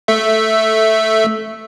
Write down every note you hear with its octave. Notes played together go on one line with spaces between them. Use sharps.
A3 E5